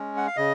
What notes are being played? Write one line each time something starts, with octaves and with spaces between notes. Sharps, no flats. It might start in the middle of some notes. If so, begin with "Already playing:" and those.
Already playing: G#3 C#4
F#5
F5
C#3 D#5